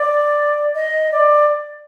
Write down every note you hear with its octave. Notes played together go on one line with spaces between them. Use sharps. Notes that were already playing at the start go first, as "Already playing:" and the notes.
Already playing: D5
D#5
D5